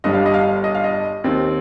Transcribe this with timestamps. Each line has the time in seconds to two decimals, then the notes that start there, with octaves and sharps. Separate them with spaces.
0.04 G1 G2 G3 D#5
0.14 F5
0.26 D#5
0.34 F5
0.64 D#5
0.75 F5
0.84 D#5
1.24 D#2 D#3 C4